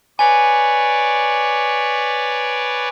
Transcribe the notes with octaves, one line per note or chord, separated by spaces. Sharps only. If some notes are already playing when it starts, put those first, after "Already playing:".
B4 C#5 D5 G#5